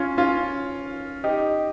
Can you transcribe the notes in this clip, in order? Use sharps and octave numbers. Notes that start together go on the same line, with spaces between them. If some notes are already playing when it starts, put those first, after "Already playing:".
Already playing: C#4 F4
C#4 F4
D#4 G4